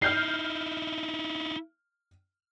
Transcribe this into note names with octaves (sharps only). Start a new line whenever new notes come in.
D#4 E4 F6 G6 C7